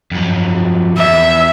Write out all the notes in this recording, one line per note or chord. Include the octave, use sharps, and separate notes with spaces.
F2 F#3
E2 E5